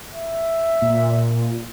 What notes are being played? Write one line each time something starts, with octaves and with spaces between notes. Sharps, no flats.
E5
A#2